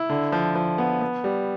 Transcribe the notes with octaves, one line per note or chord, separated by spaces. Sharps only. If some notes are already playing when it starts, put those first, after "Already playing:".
Already playing: E4
D3
F3
F3
B3
B3
G3